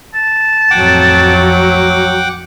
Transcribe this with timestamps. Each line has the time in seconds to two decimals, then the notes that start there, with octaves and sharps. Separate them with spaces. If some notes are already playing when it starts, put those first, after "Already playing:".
0.14 A5
0.71 A1 F2 F#3 F#5 G5 D6